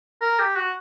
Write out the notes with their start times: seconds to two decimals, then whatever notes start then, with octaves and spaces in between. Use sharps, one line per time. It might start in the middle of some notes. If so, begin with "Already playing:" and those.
0.21 A#4
0.39 G4
0.55 F#4